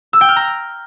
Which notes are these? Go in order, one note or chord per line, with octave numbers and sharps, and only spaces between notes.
E6
G5
F6
A#5